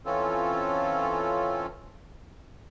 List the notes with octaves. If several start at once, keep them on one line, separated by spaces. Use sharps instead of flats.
E3 C4 C#4 F4 A4